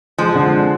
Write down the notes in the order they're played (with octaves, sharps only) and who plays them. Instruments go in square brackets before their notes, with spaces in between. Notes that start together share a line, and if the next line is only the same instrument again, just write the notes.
[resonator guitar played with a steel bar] F3 [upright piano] G#3
[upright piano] D3